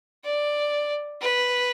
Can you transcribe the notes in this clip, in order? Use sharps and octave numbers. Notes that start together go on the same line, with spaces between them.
D5
B4